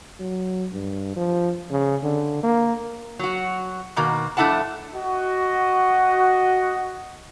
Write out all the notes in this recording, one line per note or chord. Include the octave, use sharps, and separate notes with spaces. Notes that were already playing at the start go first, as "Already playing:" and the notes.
F#3
G2
F3
C#3
D3
A#3
F#3 F#4
B2 D#3 A#3 F#4
F2 A3 D4 E4 F#5 A5
F#4 D#5